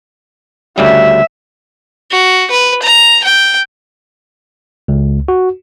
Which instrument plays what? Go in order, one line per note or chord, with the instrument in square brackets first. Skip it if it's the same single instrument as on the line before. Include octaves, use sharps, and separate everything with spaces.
[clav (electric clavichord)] D2 C#3 G3 [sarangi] E5
[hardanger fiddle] F#4
B4
A#5
G5
[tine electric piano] C#2
F#4